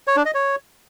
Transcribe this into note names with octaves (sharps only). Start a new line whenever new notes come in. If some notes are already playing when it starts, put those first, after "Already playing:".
C#5
D4
D#5
C#5